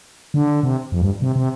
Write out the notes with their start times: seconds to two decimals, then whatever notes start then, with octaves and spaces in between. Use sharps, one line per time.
0.34 D3
0.63 C3
0.92 F2
1.02 G2
1.22 C3
1.36 C3